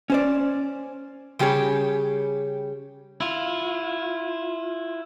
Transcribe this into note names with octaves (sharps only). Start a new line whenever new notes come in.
C#4 C5 D5
C#3 G3 G4 G#4 C#5
E4 F4